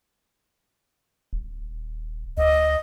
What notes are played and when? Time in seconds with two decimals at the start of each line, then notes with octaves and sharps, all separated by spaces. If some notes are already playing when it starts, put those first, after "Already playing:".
1.33 D#1
2.38 D2 D#5